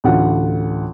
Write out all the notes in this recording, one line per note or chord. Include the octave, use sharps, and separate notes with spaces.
A1 D2 F4 F#5